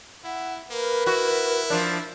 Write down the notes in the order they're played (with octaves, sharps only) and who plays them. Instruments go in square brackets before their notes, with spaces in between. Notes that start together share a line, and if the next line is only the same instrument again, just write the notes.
[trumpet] E4 [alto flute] F#5
[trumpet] A#3 [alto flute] A#4 [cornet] B4
[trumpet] E4 [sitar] F#4
[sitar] F3 D4